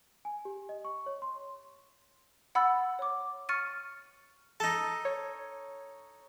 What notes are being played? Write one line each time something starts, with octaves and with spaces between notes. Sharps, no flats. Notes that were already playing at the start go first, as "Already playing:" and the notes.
G#5
G4
D#5
C#6
C#5
C6
F#5 B5 E6 F#6 A6
C#5 D6
C#6 F6 A6 C#7 D#7
D#4 A4 A5
C#5